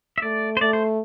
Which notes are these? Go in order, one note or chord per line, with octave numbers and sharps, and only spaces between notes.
E5
A3 D5
C5
A3 D5
C5